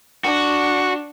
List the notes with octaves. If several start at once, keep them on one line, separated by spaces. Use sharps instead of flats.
D4 F#4